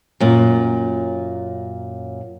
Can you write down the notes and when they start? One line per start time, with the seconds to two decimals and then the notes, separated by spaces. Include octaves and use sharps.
0.20 F#2 A#2